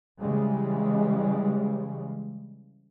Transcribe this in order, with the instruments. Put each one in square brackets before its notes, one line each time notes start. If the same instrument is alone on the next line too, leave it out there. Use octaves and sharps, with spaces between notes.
[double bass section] C#3 E3 G3 G#3